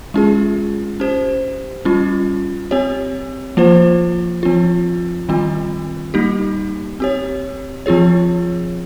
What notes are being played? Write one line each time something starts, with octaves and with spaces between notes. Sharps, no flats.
G#3 C#4 F4 G#4
C#4 G4 C5
G3 C#4 F4
C4 G4 C#5
F3 A#3 F4 C5
F3 C4 F4
D#3 G3 C4 F4
G3 A#3 D#4 G4
C4 G4 C#5
F3 C4 F4 G#4 C#5